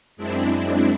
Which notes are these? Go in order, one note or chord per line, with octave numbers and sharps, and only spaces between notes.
F#2 G#3 C4 D4 E4